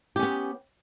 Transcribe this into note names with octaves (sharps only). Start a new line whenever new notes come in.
B3 C#4 G4